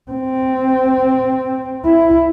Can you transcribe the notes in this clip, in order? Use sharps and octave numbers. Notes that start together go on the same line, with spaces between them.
C4
E4